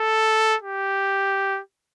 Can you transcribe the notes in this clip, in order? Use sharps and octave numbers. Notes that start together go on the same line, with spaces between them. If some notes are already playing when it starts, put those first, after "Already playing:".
Already playing: A4
G4